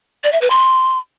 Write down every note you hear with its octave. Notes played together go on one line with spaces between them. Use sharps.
D5
E5
B4
C6